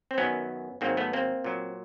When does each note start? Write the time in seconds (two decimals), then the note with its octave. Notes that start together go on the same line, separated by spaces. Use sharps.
0.11 C4
0.18 F#2 D#3 F#3 B3 C#4
0.81 G#2 D#3 F#3 A#3 C4
0.97 A3 B3
1.13 A#3 C4
1.44 A#2 F#3